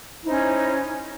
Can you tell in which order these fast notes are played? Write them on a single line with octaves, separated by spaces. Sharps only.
E4 D#4 C5 C#4